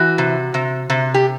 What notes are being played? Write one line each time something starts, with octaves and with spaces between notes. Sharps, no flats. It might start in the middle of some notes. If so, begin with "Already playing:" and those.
Already playing: E3 F#4
C3
C3
C3
G4